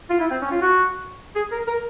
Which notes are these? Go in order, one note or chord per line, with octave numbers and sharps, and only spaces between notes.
F4
E4
C4
C#4
F4
F#4
G#4
A#4
A#4